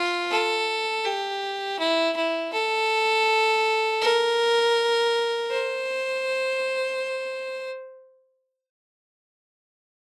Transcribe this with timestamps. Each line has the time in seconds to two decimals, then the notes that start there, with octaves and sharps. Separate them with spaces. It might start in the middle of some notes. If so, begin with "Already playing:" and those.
Already playing: F4
0.30 A4
1.05 G4
1.79 E4
2.16 E4
2.53 A4
4.02 A#4
5.51 C5